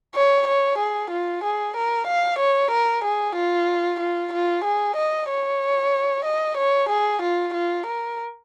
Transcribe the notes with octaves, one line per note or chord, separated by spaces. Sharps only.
C#5
C#5
G#4
F4
G#4
A#4
F5
C#5
A#4
G#4
F4
F4
F4
G#4
D#5
C#5
D#5
C#5
G#4
F4
F4
A#4